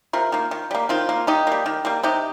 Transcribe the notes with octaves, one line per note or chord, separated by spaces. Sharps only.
C3 F4 A#4
D#3 A#3
D#3
G3 A#3
D#3 C4 F4
A#3
D#3 D#4 G4
G3 A#3
D#3
G3 A#3
C3 D#4 G4